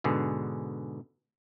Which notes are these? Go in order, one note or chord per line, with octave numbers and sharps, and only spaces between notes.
G#2 B2 D3 G#4